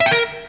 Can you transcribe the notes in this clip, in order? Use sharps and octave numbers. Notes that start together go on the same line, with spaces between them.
E5
G5
A#4